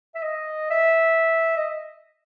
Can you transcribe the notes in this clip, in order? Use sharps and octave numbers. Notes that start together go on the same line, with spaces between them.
E5
D#5
E5
D#5